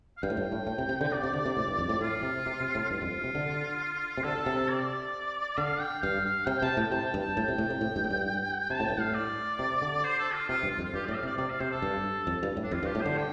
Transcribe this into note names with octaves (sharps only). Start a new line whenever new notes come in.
F5
G2 G5
A2
G2
A2
A2
C3
C3
D3
C3 D5
C3
D3
C3
A2
G2
F2
A2
A2 F4
C3
C3
C3
A2
G2 F4
F2
C3
D3
C3
D3 A4
C3
D5
D3 F5
G5
G2 F5
F5
C3 G5
G5
C3 A5
A2 G5
C3 A5
G5
G2
A5
A2 G5
C3
A2
C3
A2
G2
A2
G2
C3 A5
A2
G2 G5
A2 F5
D5
C3
D3
C5
A4
F4
C3 F4
G2
F4
F2
F4
G2 G4
A2 D5
F5
C3
D5
C3 D5
F5
C3 C5
A4
G2
F2
G2
A2
D4
F2 F4
G2
G4
A2
D3 C5
G5